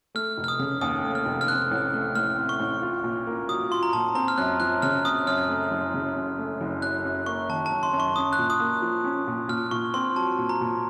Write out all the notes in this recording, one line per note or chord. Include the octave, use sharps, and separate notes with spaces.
A3 F6
F1
F6
D#6
C#3
D#2 D#6
A3
F6
F1
F6
C4 F#6
A1
A3
A2 F6
C4
C#6
A1
F4
A#2
A#3
F#3 D#6
F4 C6
A#5
A#2 A5
C4 A#5
F6
F#2 F#6
F3 F#6
C#3 F6
C4 D#6
F#2 F6
A3
F#1
C#3
F#2
A3
F#1
F#2 F#6
F#2
A#3 C#6
D#3 A5
A5
F#2
C6
F#2
C#6
C#4 D#6
F#6
A#2
D#6
A#3
F3
C#4
A#2
A#2 F6
A#2 C#6
C4 C6
F#3 A5
A#2
A#5
A#2